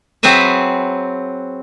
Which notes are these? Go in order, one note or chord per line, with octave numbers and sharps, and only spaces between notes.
F#3 C4 G#4 B4 E5